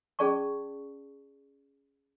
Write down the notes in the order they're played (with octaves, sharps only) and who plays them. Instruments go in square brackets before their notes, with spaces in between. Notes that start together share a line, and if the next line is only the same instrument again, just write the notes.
[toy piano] C#4 G#4 D5 A5 C#6